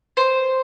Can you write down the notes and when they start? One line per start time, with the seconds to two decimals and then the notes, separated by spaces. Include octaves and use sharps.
0.17 C5